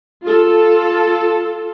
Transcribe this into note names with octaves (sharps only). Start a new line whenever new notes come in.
F4 A4